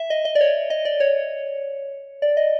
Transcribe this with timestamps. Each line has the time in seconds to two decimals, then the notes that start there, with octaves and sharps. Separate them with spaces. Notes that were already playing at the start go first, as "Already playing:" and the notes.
Already playing: E5
0.10 D#5
0.25 D#5
0.35 D5
0.41 C#5
0.70 D#5
0.85 D5
1.00 C#5
2.22 D5
2.37 D#5